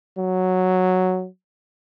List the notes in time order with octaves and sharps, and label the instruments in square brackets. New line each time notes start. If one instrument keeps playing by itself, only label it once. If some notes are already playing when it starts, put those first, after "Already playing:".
[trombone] F#3